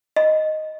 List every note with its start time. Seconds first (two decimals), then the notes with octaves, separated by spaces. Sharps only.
0.16 D#5